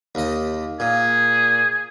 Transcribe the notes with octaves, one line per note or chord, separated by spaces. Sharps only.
D#2 D#5
A#2 G#4